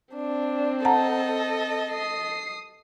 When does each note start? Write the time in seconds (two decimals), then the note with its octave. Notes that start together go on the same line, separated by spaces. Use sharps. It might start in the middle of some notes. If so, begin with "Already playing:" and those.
0.15 C4 D4
0.85 A4 D#5 F#5 A5 A#5
1.92 D#6 C7